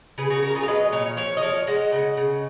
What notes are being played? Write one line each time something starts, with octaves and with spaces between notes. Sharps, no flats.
C#3 G#4 B4
F#4 A#4
G#3 F#4 A#4
F4 G#4
F5
F#3 B4 D#5
A#2 C#5 F5
F3 C#5 F5
D#5
F3 C#5 F5
G#3 D#5 F#5
C#3
C#3